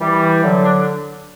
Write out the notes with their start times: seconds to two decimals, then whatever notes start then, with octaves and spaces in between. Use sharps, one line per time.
0.01 E3 G3
0.43 D3 F#3
0.64 D4